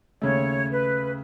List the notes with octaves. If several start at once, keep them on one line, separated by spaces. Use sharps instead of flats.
D#2 C#3 A3 C#5
B4